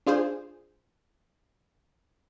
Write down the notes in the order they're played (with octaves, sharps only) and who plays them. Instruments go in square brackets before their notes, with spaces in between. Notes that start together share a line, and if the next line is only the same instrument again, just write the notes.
[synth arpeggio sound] D4 F4 G#4 C5